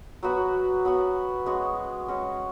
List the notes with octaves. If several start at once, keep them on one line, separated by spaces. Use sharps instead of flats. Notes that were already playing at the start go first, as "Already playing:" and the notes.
F#3 B3 F#4 B4
F#3 B3 F#4 B4
G#3 C#4 F#4 C#5
G#3 C#4 F#4 C#5